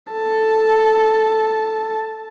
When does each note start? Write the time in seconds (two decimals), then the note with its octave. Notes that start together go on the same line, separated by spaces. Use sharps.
0.12 A4 A5